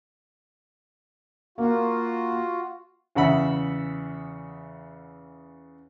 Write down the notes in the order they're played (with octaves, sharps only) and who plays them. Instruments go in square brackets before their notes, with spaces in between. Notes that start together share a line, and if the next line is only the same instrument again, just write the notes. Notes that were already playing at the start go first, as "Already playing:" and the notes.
[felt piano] A#3 [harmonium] F4 F#4
[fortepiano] E2 C#3 E5 F#5 B5 E6